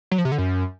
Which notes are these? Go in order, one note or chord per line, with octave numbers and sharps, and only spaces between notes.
F#3
F3
C3
D3
F#2